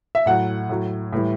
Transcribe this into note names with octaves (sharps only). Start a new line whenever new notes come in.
E5
A2 F#3 F#5
A2 F#3
A2 E3 G3